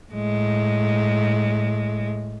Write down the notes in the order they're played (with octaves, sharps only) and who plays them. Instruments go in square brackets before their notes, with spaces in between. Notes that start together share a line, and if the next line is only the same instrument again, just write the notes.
[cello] A2 G#3